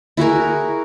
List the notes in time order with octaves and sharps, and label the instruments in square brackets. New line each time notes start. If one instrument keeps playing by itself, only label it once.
[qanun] E4 F#4 G#4 A#4